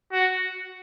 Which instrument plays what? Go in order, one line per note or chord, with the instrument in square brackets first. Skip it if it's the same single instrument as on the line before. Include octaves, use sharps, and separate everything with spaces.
[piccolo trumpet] F#4